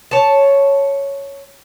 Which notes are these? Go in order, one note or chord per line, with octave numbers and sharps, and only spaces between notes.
C#5 A5